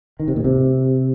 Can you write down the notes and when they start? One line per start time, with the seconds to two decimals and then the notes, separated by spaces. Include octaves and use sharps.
0.20 D#3
0.28 C3
0.36 A#2
0.44 C3